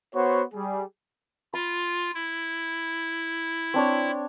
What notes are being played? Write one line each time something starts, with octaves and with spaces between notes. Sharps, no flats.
B3 F#4 C5 C#5
G3 G#4
F4 B5
E4
C4 D4 C#5